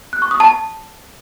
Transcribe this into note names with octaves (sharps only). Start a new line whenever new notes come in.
F#6
C#6
D#6
A5